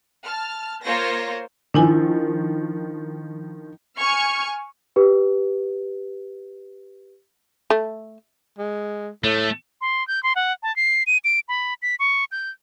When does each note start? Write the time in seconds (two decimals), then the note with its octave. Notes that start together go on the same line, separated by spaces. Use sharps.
0.25 A5 F6
0.83 A#3 F4 C5 C#5 A#6
1.74 D#3 F3 D4 E4 G#5
3.99 G#5 C#6 F6 G#6
4.96 G4 B4
7.70 A3
8.58 G#3
9.24 A2 A3
9.81 C6
10.08 G6
10.23 C6
10.36 F#5
10.63 A5
10.76 C7
11.07 D#7
11.24 D7
11.48 B5
11.82 B6
11.99 C#6
12.32 G6